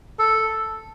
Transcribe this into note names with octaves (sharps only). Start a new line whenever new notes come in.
A4